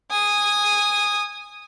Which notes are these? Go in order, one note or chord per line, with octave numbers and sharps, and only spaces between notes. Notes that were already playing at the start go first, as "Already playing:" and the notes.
G#5 D#6